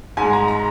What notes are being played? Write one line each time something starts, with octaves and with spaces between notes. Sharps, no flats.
G#2 G#3 G#5
A#5
A#5